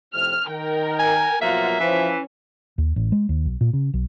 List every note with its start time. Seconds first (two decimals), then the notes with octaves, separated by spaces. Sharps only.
0.14 F2 A2 C3 F6
0.48 D#3 A#4 G5
0.99 G#5
1.41 B2 F3 F#3 A#3 F4 E5 F#5
1.80 E3 F3 C#4
2.78 D#2
2.96 A1
3.12 G#3
3.29 D#2
3.45 B1
3.61 A#2
3.73 C#3
3.94 B1